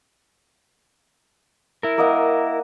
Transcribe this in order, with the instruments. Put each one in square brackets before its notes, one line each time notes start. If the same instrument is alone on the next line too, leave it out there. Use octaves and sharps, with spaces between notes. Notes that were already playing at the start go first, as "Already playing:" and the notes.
[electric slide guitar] E4 A#4
[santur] A#3 D#5 F#5